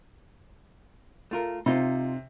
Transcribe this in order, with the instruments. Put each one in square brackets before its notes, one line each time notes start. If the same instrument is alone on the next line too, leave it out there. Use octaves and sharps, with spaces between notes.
[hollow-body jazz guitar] A3 F4 A#4
[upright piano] C3 [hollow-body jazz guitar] D#4 F4 C5